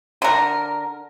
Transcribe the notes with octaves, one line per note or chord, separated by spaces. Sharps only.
D3 A#4